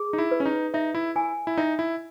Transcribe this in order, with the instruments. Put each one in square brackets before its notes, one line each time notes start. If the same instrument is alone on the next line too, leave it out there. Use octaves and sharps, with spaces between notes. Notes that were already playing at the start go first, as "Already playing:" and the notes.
Already playing: [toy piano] G#4
[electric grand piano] D#4
E4
[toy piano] B4
[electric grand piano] C#4
D#4
[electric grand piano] D#4 [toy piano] E5
[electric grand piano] E4
[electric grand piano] E4 [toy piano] G#5
[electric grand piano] E4
[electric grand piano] D#4 [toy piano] E5
[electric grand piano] E4